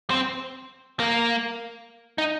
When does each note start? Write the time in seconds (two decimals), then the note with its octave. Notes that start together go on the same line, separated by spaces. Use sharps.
0.10 C4
1.00 A#3
2.18 D#4